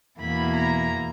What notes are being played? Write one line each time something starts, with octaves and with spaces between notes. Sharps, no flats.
E2 B2 A#3 E4 B5
A#5